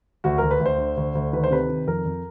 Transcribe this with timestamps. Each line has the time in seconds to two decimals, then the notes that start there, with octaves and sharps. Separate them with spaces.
0.24 D2 F#4
0.38 D2 A#4
0.51 B4
0.60 D2
0.66 C5
0.78 D3
0.97 D2
1.15 D2
1.33 D#3 B4
1.44 C5
1.51 C3 B4
1.69 D#3
1.87 F2 A#4
2.06 F2